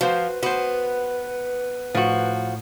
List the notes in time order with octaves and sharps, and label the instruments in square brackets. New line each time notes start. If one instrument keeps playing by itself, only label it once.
[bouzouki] F3 [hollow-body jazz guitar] F#4 C5 [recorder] B4
[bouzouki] B3 [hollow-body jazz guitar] F#4 C5
[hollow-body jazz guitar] A2 [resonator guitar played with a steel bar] F3 F#4